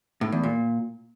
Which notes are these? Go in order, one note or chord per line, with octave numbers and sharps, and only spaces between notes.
A2
E2
A#2